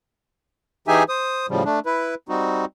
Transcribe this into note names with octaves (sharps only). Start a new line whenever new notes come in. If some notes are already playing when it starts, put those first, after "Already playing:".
E3 D#4 G4 G#4 E5 G#5
C5 D#6
A2 C#3 F3 G3
A3 D4
E4 B4
G3 C4 D#4 F#4